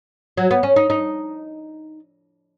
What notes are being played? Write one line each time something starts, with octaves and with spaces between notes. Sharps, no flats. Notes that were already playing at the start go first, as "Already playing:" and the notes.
F#3
B3
C#4
D#4
D#4